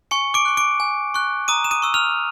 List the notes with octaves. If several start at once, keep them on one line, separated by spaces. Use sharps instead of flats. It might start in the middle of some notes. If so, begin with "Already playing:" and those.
G#5 C#6 C#7
D6 D7
C#6 F#6
D6 D7
G#5
C#6 F#6
A#5 D#6 D#7
E7
D#6 D#7
C#6 E6
F6 F7